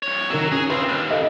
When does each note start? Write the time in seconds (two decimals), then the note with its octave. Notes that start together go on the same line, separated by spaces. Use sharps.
0.03 C2 C#5
0.30 D#3 F#3 A#4 E6
0.52 C#4 G#4
0.70 C4 F4 B4 E6
0.89 D#2
1.10 A4 D#5 F5